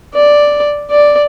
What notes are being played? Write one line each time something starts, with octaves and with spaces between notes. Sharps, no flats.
D5
D5